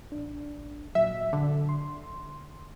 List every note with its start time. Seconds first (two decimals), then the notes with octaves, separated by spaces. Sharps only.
0.12 A1 D4
0.95 A#2 F#3 E5
1.33 D3
1.69 C6